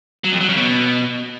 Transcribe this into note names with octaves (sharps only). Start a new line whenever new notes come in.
F#3
F2
F#3
C#3
B2